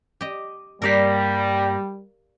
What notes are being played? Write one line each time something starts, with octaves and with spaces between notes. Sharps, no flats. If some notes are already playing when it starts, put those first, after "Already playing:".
G4 D#5
G2 G3 A#3 G4 A#4 D5 F5